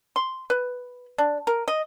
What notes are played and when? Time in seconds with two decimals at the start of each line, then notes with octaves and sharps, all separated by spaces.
0.16 C6
0.50 B4
1.18 D4
1.47 A#4
1.68 D#5